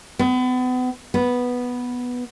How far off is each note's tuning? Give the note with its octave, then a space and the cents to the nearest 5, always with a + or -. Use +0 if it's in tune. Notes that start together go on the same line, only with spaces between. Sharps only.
B3 +35
B3 -5